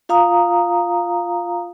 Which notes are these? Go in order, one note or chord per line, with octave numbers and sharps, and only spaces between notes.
F4 F5 A#5 D#6